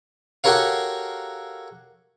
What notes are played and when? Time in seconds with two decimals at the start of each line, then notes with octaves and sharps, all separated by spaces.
0.44 F#4 G4 A4 A#4 C#5 F5